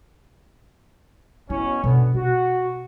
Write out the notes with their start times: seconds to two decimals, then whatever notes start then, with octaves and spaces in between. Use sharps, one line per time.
1.50 B2 C#4 E4
1.84 B2 D3 B3
2.14 B2 F#4